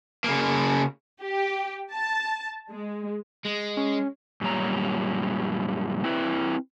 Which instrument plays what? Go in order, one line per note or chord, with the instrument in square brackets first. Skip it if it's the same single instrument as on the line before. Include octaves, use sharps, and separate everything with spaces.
[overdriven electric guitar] C#3 A#3
[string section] G4
A5
G#3
[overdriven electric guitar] G#3
[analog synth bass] C#4
[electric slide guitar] F#2 A#2 G3 C#5 A#5
C4 E4 B4